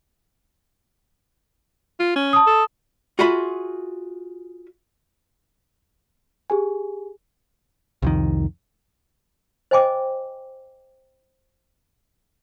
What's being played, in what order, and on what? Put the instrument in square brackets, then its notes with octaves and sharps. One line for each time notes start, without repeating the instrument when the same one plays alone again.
[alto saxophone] F4
C#4
[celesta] A5 D#6
[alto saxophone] A4
[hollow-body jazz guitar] F4 F#4 G#4 E5 B5
[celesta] G4 G#4 G#5
[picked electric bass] C2 F2 D#3
[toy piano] C5 D#5 G5 G#5 C6 D6